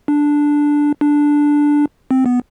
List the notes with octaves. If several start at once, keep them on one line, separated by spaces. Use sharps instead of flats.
D4
D4
C4
B3